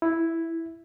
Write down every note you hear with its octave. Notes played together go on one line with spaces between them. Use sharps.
E4